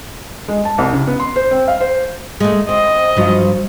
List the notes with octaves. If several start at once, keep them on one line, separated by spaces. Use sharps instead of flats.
G#3
A5
C2
C#3
B3
C6
C5
C4
F5
C5
G#3 A3
C4 D#5
G2 F3 F#3